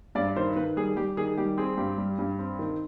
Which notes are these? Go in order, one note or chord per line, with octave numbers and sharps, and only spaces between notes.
G2 D5
D#3 C5
D#3 B4
G3 G#4
G3 G4
D#3 G#4
G3 G4
C4 G#4
G2 G4
G3
G2
C4
D#3